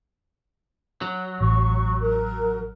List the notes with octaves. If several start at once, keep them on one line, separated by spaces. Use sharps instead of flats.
F#3
A1 C#6
A#4